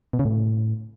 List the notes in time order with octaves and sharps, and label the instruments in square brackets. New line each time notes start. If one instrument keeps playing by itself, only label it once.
[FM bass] B2
C#3
A2